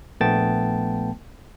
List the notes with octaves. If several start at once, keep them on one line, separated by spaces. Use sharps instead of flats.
A#1 A3 B3 G5 A5 A6